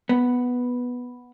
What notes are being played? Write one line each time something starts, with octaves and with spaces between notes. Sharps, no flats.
B3